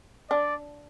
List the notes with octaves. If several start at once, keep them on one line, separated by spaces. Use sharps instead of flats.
D4 D5